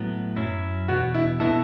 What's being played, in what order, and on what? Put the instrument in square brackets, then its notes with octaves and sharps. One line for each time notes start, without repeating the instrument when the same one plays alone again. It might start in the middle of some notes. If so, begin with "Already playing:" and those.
Already playing: [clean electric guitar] A2 F#3 B3
F#2 F#3 C#4 E4
[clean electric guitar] E2 B2 B3 [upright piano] F#4
[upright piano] E4
[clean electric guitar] B2 B3 F#4 A4 [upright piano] E4